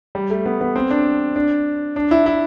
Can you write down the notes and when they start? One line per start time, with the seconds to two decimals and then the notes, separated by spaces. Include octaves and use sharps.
0.15 G3
0.30 A3
0.45 B3
0.61 B3
0.76 C4
0.91 D4
1.36 D4
1.96 D4
2.11 E4
2.26 E4